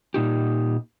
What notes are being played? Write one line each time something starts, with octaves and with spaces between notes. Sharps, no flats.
A#2 D#4 G4